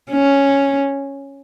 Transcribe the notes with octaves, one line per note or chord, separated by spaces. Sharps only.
C#4